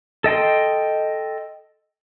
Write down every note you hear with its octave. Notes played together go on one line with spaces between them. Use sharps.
A4 D#5 G5 C6